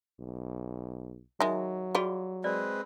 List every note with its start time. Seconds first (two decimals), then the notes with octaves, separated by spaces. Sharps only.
0.19 B1
1.40 D#3 F#3 G#3 D#4 E5
1.95 G3 F4 F#4 G#4
2.44 G#3 C4 B4 D5